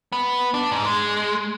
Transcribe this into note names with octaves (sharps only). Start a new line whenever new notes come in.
B3
D4
G#2
G#3